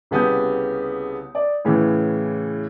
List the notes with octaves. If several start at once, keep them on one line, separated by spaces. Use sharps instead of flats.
C2 C#3 B3 G4 D#6 G6
D5
A2 C#3 E3